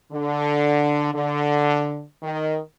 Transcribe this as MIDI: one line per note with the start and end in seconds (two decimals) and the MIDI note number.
0.11 1.11 50
1.13 2.04 50
2.23 2.58 51